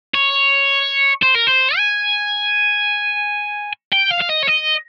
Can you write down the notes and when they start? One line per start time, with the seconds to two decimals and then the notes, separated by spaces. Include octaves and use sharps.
0.15 C#5
1.22 C5
1.35 A#4
1.47 C5
1.77 G#5
3.93 G5
4.11 F5
4.21 F5
4.30 D#5
4.43 C#5
4.48 D#5